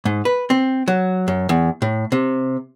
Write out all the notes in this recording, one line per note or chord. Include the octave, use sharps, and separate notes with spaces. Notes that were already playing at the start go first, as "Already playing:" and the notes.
G#2
B4
C4
F#3
F#2
E2
A2
C3